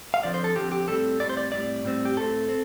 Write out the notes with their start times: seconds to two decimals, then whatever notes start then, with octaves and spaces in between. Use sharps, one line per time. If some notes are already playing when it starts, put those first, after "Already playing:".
0.14 F5
0.23 D3 F3 C4 D5
0.34 C5
0.44 A4
0.55 D3 F3 C4 G4
0.72 G4
0.88 A2 G3 C4 A4
1.20 A2 G3 C4 D5
1.30 C5
1.37 D5
1.52 A2 G3 C4 D5
1.85 A2 G3 C4
2.05 G4
2.16 A2 A3 C4 A4
2.49 C4